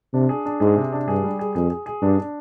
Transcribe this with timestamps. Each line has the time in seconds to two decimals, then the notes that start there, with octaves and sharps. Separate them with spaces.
0.14 C3 D4
0.29 G#4
0.45 D4
0.60 G#2 G#4
0.76 C3
0.93 D4
1.08 G2 G#4
1.23 G3
1.39 G#4
1.55 F2 G#4
1.70 G#4
1.86 G#4
2.02 G2 D4
2.18 D4